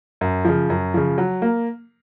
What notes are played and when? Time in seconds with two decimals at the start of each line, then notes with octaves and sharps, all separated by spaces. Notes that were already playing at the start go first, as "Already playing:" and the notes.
0.21 F#2
0.45 C#3 F3
0.70 F#2
0.94 C#3 F3
1.18 F#3
1.42 A#3